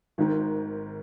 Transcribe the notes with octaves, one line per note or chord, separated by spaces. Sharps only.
G#1 G#2 D#3